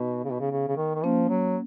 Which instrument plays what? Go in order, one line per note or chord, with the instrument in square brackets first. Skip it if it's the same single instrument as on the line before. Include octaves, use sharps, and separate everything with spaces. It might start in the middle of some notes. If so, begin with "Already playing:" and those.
Already playing: [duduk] B2 [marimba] B3 D#4
[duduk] C#3
B2
C#3
C#3
C#3
D#3
D#3
[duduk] F3 [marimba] A#3 C#4
[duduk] F#3